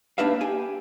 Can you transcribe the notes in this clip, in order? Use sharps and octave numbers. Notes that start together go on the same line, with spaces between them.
A#3 D4 D#4 B4 E5 F5
G4 G#5